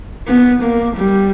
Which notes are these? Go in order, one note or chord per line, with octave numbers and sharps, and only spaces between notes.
B3
A#3
G3